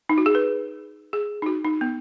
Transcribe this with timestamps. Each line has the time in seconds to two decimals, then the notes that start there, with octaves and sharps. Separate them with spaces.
0.09 D#4
0.18 F#4
0.26 G#4
0.35 B4
1.13 G#4
1.42 D#4
1.46 F#4
1.64 D#4
1.81 B3